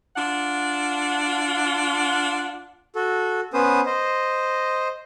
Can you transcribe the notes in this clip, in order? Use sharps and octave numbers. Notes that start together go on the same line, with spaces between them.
D4 F4 F#5
F#4 A4
B3 C#4 B4 C5 D#6
C5 D#5